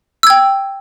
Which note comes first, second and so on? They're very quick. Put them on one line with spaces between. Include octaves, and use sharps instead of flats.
E6 G#6 G5